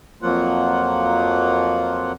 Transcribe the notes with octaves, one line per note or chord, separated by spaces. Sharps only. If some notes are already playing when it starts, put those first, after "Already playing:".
F2 F3 F#3 A#3 F4 F#5